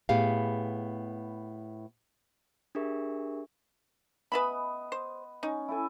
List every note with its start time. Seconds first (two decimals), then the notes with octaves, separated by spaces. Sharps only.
0.09 A2 B3 G4 G#4 F5
2.75 D4 G4 G#4 A#4 E5 C#6
4.32 B3 B4 D#5 E5 G#5 B5
4.92 C5
5.43 C#4 D#4
5.69 E4 A4 G#5